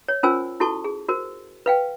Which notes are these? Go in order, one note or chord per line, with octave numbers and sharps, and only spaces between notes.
C#5
C#4 F4 A#4 C5 G#5 E6
E4 F#4 A4 A5 C#6
G#4
F#4 A#4 C5
B4 F5 G5